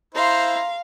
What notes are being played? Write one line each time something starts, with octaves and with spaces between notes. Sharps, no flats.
E4 C5 F5 A#5 C6